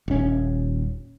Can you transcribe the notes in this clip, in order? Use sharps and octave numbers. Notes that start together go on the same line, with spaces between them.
D#1 C#4